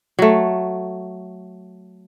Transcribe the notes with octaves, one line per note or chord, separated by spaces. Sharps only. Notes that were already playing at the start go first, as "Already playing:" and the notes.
F#3 A3